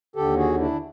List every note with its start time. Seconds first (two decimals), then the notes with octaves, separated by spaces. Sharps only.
0.16 D#2 D3 G4 A4
0.37 F#4 G#4
0.58 D4 E4